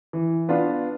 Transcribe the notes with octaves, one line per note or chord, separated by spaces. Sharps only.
E3
B3 D4 F4